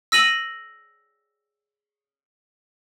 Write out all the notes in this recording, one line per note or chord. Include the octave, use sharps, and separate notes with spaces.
E6 A#6 D#7 F#7